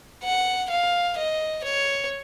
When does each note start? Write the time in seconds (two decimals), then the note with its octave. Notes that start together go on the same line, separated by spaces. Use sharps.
0.23 F#5
0.70 F5
1.17 D#5
1.64 C#5